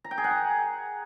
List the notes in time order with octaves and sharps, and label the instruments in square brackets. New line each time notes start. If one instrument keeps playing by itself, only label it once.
[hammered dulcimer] A#5
G5
G#4
F#5
A#5